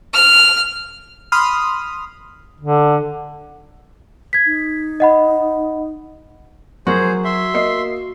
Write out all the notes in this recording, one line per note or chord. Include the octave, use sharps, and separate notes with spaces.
F6
B5 C6 D#6 F6
D3
G#6 B6
D#4
D#5 F#5 B5
F#3 F#4 G#4 A#4 C5
E5 C6
A#3 D#5 C7